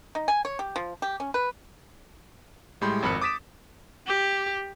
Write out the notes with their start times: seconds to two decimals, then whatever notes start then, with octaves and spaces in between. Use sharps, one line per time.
0.15 D#4
0.28 G#5
0.45 C#5
0.59 G4
0.76 F3
1.02 G4
1.20 C#4
1.34 B4
2.81 A2 G3 G#3 B5 C6 G6
3.02 G#1 F2 A#4 B5 F#6 C#7
3.21 D6 D#6 A6 B6 D7 E7
4.07 G4